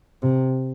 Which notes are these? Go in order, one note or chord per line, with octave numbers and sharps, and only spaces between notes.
C3